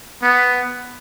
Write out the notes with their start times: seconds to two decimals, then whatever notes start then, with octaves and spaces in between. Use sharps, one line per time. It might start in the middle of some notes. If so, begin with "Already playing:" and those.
0.23 B3